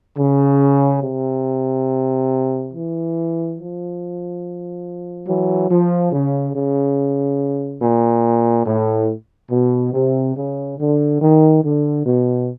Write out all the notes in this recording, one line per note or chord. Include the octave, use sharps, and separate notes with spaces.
C#3
C3
E3
F3
E3 F#3
F3
C#3
C#3
A#2
A2
B2
C3
C#3
D3
D#3
D3
B2